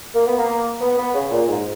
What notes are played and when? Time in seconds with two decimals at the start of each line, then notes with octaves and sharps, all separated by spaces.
0.14 A#3
0.26 B3
0.38 A#3
0.81 B3
0.97 B3
1.14 C#3
1.30 A#2
1.47 G#2